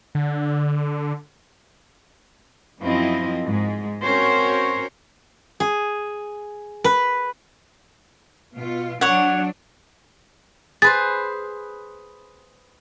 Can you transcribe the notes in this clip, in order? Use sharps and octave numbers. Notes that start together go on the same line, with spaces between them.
D3
F#2 F3 C4 E4 D#5
G#2 G#3
C4 C#4 F#4 A#4 C5 C#5
G#4
B4
B2 F4
F#3 D4 C#5 F#5
G#4 B4 C5 A6